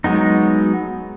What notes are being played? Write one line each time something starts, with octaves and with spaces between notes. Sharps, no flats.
F#3 G#3 B3 D#4